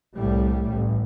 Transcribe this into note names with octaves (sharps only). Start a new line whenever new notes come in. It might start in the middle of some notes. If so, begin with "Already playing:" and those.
C2 A2 G3
A1